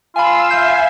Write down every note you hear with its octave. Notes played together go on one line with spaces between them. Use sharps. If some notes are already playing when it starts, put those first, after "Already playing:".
F4 F5 G#5 B5 E6
E5 G#5 G6